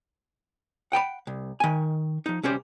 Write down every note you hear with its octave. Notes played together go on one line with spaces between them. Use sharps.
F#5 G5 A#5 B5
C2
D#3 G#5
F3 D#4
C2 C#4 G4 C5